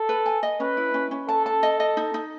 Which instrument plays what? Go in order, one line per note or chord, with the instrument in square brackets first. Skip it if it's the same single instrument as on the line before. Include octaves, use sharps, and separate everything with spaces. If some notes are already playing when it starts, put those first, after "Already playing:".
Already playing: [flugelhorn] A4
[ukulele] B4
G#5
D#5
[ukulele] C#4 [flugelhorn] B4
[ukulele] E4
C#4
C#4
[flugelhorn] A4 [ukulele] A5
[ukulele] A5
D#5
D#5
D#4
D#4